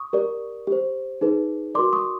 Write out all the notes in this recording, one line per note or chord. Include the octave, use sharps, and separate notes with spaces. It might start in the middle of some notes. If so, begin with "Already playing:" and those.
Already playing: C#6 D#6
G4 A#4 D5
G4 C5
D#4 G#4 B4
F#4 A#4 D5 C6 D6
C#6 D#6